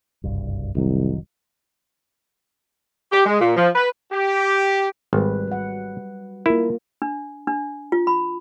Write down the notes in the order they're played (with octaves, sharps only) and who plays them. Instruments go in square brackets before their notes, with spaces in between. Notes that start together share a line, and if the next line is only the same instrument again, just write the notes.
[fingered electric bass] F#1 C2 G2
[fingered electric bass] F1 D#3 F#3 [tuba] C2
[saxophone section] G4
G#3
A#2
F3
B4
[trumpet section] G4
[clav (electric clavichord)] G#1 [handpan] G3 B4
[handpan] F#3 F#5
[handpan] A#3 F4 A#4 [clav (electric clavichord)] E4
[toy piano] D4
D4
F4
B5